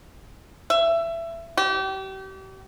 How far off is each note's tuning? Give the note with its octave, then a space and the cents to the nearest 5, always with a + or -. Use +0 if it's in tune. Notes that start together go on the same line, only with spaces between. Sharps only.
E5 +20
G4 -35